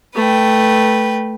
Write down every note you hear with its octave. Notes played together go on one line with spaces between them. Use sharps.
A3 B4 G5